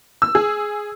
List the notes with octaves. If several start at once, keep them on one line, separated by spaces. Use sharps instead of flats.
E6
G#4